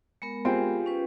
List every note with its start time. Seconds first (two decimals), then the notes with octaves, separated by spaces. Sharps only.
0.22 G#3 B3 A#4
0.45 C4 F4 G4 G#4
0.86 C#4 B4